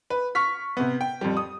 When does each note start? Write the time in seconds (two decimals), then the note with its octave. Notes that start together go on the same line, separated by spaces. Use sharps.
0.10 B4
0.35 C#6 F6 B6
0.77 C3 B3
1.01 G5
1.21 F2 G3
1.37 D#6